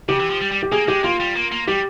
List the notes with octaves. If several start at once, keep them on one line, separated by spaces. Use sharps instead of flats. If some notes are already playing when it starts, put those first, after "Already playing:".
C#3 G4
E3
F3
G3
G3
G4
A#3 G#4
G#3 G4
A#3 F4
G3
A#3
A#3
G3 G4